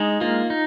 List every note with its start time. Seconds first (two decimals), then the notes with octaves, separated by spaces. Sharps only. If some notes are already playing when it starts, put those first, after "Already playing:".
Already playing: G#3 D#4
0.21 A#3 F4
0.50 D#4